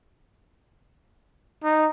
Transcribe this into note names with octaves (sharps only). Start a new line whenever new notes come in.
D#4